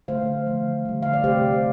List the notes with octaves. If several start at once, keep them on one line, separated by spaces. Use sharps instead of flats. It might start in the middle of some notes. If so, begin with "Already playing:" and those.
D3 A3 C5 F5
D3 F3 A3
D3 G3
F5
D5
C3 A3 G4 C5